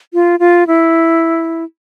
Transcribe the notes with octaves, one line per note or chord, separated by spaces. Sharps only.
F4
F4
E4